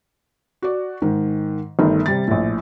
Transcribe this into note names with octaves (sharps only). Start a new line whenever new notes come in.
F#4 D5
G#2 D#3
G1 D#3 A3
C3 G3 A6
A#1 A2